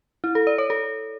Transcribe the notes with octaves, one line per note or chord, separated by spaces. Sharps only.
E4
A4
D5
C#5
A4